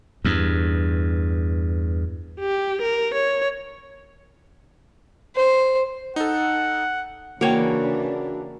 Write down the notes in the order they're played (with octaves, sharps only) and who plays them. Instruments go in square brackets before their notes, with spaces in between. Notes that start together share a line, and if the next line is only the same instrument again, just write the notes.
[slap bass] E2 G2
[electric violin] G4
A#4
C#5
[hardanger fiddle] C5
[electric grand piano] D#4 A4 [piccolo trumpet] F#5
[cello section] C#3 E3 D4 [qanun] A#3 C#5 [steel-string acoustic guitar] F#4 G5